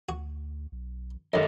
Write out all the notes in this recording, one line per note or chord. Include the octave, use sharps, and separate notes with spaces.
D2 F#4
B1
F#2 D#3 G4 A4 D#5